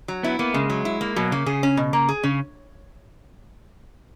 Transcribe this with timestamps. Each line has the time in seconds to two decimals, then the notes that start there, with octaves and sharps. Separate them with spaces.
0.08 F#3
0.23 B3 E4
0.39 A#3 B3
0.54 C#3 G#3
0.70 F#3
0.85 E4
1.01 A#3
1.16 B2 F#3
1.32 C#3 A#3
1.46 C#3 G#4
1.63 C#4
1.77 B2
1.93 A#3
2.09 G#4
2.23 C#3 C#4